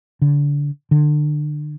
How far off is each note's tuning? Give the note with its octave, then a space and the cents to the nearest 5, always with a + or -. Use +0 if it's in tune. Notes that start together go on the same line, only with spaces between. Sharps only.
D3 -25
D3 +30